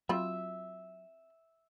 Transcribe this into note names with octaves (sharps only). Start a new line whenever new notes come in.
F#3 C4 F4 E5 B5